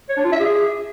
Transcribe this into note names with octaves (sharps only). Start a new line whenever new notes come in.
C#5
D4
F4
E5
G#4